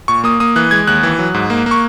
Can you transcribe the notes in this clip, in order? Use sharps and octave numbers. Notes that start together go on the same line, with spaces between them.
A#2 C#6
A#3 D#6
A#3 D#6
E3 F#6
G#3 G#6
D#2 F#6
E3
F#3
G#2
A#3
A#3
C#6